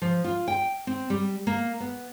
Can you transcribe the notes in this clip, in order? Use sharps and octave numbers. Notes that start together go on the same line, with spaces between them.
F3
F4
G5
C4
G3
A#3
B3